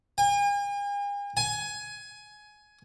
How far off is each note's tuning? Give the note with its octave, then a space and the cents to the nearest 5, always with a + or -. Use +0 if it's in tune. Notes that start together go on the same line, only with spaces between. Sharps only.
G#5 -45
G#5 +15